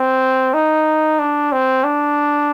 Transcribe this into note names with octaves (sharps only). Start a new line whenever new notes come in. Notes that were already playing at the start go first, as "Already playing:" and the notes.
Already playing: C4
D#4
D4
C4
D4